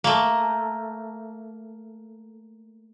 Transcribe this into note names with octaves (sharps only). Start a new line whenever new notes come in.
A3 A#3